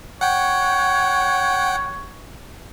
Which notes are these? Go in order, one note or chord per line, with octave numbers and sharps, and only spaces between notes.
C#5 F#5 G5